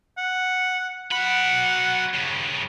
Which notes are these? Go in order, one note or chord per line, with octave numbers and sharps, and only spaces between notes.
F#5
F#3 F#5 B5
G2 C#3